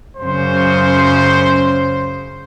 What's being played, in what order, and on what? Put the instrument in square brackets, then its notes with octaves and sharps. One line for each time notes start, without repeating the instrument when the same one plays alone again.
[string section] F#2 C#3 [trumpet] C5